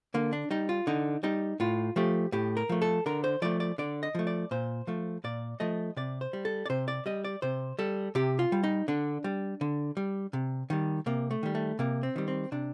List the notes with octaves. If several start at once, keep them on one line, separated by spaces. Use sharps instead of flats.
D3 A#3
D4
G3 D#4
F4
D3 D#4
G3 D#4
A2 F4
F3 A3 G4
A2 G4
A#4
F3 A3
A4
D3 A#4
C5
F3 A3 D5
D5
D3 D5
D#5
F3 A3
D5
A#2 C5
F3 A3
A#2 D5
F3 A3 D#5
C3 D5
C5
G3
A4
D5
C3 C5
D5
G3 D#5
D5
C3 C5
G3 A4
C3 G4
F4
G3
D#4
D3 D4
G3
D3
G3
C3
D#3 G3
C3 A#3
A3
D#3 G3
A3
C3 A#3
C4
D#3 G3
C4
C3 D4